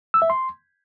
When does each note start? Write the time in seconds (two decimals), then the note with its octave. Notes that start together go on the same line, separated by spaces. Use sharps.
0.14 E6
0.22 E5
0.30 C6